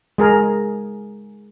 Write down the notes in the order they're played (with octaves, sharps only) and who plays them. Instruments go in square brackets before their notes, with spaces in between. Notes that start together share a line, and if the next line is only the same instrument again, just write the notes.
[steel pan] G#3 G#4 A#4